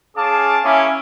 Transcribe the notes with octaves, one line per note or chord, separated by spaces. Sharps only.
C#4 G#4 F5 A5 D6
A#3 C#4 E4 G#4 E5 D6